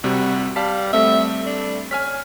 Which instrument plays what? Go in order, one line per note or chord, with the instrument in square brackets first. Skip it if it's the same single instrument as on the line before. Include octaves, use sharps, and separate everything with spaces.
[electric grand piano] C2 C3 G3 [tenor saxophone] F#4
[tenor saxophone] G3 [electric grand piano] F5 A5 B6
[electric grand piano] G3 A3 C4 [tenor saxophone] E5
[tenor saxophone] D4
[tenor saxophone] C#4 [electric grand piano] G#5 F6 B6